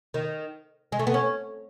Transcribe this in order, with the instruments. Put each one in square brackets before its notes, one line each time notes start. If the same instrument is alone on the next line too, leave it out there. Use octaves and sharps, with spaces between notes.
[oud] D#3
G#3
A3
B3
C#4